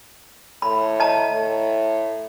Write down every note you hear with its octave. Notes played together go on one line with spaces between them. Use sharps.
A2 B5
D#5 A5 A#5
A2